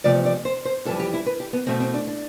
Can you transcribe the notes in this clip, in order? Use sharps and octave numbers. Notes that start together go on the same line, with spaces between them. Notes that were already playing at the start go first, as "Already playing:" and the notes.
E2 C3 F3 A3 D5
D5
C5
C5
F2 E3 G3 A4
G4
E4
B4
G4
B3
E2 B2 A3 C4
C4
D4
D4